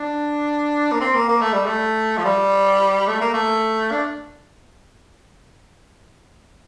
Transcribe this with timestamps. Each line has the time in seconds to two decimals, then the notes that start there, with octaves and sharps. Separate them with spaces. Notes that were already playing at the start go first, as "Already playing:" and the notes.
Already playing: D4
0.92 A#3
1.01 C4
1.15 A#3
1.28 A#3
1.42 A3
1.53 G3
1.66 A3
2.18 F3
2.25 G3
3.08 A3
3.21 A#3
3.34 A3
3.92 D4